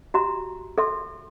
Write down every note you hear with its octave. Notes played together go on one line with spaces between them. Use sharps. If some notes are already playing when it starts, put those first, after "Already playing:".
F#4 G4 E5 A#5 C6
A4 E5 C6